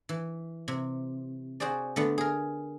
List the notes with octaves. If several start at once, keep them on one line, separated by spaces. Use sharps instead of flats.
E3
C3
F#4 G#4 C5 D5
D3 A3 B3
G#4 A#4